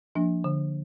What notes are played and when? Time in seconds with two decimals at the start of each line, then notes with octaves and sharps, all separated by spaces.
0.15 F3 A#3 D4
0.44 D3